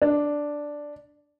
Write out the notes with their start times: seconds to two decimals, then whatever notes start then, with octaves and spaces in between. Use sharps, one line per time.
0.02 D4